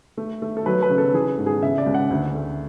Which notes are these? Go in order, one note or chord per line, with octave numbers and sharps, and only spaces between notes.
A3
A3
A4
F#3 B4
B4
C#3
A4
E3 G#4
G#2
G#4
C#3 E5
D5
C#2
F#5
D2
A3